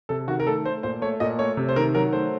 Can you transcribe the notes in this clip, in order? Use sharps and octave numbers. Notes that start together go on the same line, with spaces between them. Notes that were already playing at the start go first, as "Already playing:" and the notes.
C3 A4
D#3 F#4
A#4
A3 A4
A3 C5
A#2 C5
A3 C#5
A#2 D#5
A3 C#5
C3
C5
D#3 A#4
F#3 A#4
A3 C5